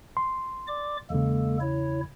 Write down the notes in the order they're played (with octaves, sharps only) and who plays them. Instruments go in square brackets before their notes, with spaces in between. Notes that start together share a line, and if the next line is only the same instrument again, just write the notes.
[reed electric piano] C6
[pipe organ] D5 D6
[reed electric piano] E2 C#3 [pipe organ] G#3 A#3 A4
[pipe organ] E4 C#5